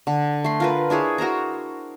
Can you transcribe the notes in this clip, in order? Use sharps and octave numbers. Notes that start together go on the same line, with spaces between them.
D3
A3 C6
F4 A#4 B4
D4 E4 G#4 C#5
F#4 A#4 C5 A#5